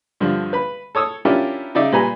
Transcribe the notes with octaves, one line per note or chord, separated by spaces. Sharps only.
G2 D3 F3
B4 B5
A4 C#5 D#6 E6
C#4 D4 E4 F4 G4 A#4
C#3 D#4 D5 E5
A#2 G3 B4 G#5 A#5 B5